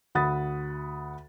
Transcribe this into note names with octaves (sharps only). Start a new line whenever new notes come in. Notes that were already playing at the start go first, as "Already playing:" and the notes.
D2 F#5 B5 D#6 A6